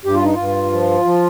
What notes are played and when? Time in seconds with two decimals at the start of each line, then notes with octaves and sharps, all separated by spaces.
0.05 G2 G4
0.14 F4
0.25 D#4
0.34 G2 F4
0.72 F3
1.05 F3